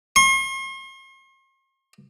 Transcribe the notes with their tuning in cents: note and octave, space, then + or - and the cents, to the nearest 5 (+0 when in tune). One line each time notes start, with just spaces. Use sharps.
C6 +45